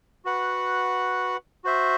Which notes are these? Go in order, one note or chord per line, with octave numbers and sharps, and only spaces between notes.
F#4 B4 F#5
F#4 C5 E5